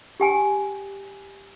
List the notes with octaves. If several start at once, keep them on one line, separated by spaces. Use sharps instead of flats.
G4 G5 G#5